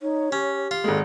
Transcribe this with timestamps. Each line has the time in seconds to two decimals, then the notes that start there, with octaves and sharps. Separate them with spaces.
0.01 D#4 C#5
0.32 C#4 G4
0.71 F4
0.84 G#1 G#3 A4